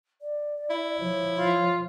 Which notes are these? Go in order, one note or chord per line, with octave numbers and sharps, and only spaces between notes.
D5
E4
F3 C#5
F4